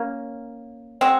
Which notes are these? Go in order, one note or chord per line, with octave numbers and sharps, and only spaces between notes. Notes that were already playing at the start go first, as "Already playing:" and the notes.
Already playing: A#3 C#4
G#3 C4 F#4